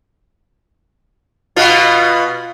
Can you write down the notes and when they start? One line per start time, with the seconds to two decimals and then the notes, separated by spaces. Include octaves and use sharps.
1.56 B2 B3 F4